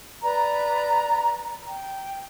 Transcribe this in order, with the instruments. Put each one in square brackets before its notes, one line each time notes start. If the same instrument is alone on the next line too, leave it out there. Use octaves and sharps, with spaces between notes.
[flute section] B4 D5 A#5
G5